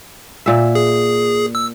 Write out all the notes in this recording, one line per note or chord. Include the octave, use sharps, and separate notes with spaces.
A#2 E5
G#4
E6